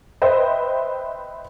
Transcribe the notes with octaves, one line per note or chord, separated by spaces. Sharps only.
B4 C5 D#5 E5 G5